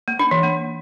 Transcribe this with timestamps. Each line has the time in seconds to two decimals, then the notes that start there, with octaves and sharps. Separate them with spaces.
0.08 A#3
0.19 D4
0.31 E3
0.43 A#3